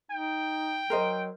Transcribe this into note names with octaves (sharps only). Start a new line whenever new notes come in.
D#4 G5
F#3 A#4 C5 D#5